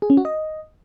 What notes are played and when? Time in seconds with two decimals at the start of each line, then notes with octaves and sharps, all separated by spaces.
0.02 G#4
0.10 C#4
0.17 F#4
0.25 D#5